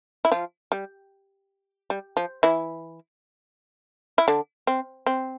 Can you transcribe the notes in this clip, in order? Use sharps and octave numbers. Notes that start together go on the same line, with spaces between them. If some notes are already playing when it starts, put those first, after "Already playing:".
E4
F3 F4
G3
G3
F3
E3 E4
E4
D3 D4
C4
C4